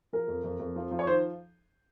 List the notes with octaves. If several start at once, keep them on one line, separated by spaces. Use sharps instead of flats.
F3 A#4
F2
F2
F2
F3
F3
C#5
D#3 C5